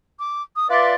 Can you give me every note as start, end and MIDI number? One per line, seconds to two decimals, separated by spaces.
0.20 0.43 86
0.57 0.69 87
0.70 0.95 65
0.70 0.95 71
0.70 0.95 74
0.70 0.94 76
0.70 0.94 84
0.70 0.94 90